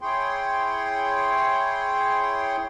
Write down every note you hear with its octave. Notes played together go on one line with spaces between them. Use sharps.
E4 G#4 C#5 G5 C6